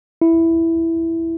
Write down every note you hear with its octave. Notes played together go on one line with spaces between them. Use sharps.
E4